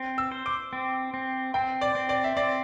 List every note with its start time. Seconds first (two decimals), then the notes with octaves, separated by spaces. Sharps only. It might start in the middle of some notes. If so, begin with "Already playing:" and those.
Already playing: C4
0.18 E6
0.32 C5
0.46 D6
0.73 C4
1.14 C4
1.54 C4 G5
1.81 D5
1.95 C4
2.09 D5
2.24 E5
2.36 C4 D5